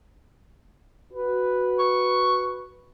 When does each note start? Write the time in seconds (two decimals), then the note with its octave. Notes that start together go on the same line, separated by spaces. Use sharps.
1.13 F#4 B4
1.79 C#6